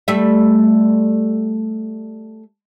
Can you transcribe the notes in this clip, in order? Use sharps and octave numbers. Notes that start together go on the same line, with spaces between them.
G3 A3 E5